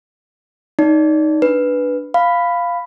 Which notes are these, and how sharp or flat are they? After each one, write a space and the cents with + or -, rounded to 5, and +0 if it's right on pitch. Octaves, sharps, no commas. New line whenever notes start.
D#4 +0 D5 -30
D4 +0 B4 +0
F5 +0 B5 +10